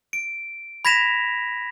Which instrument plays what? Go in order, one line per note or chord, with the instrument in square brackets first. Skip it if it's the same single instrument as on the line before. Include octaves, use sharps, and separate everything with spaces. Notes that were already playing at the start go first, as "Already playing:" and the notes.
[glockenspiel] D7
B5 G#6 A#6 B6 E7 F7